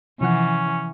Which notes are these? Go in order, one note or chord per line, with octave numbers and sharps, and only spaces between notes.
C3 E3 F3 C#4 F#5